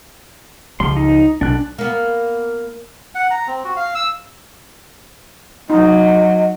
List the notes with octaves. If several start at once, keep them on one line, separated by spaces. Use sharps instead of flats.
C#2 F3 G3 C6
D#4
B1 D4 F#6
A#3 B3
F#5
A#5
C4
F#4
F5
E6
F#3 D#4 D#5